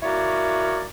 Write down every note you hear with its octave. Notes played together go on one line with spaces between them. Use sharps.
A#3 E4 F#4 A#4 C#5 D5